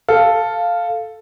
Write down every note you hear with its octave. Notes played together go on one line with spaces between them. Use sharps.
A4 F5